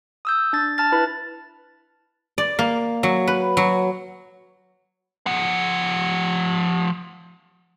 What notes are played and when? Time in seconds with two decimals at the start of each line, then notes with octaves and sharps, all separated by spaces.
0.25 D#6 E6 G6
0.53 D4 A6
0.78 A5 F6 A6
0.92 E4 B4 B5
2.38 D5
2.59 A#3
3.03 F#3
3.27 B4
3.57 F#3
5.26 F3 F#5